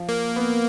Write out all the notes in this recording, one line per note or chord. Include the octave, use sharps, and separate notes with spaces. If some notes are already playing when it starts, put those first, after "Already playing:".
Already playing: F3
A#3
B3